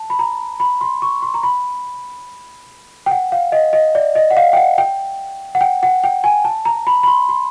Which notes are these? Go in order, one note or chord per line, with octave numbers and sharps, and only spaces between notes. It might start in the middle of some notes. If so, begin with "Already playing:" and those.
Already playing: A5
B5
A#5
B5
C6
C#6
C6
A#5
B5
G5
F#5
F5
D#5
D#5
D5
D#5
F#5
F5
G5
F#5
G5
F#5
G5
F#5
G5
G#5
A5
A#5
B5
B5
C6
C6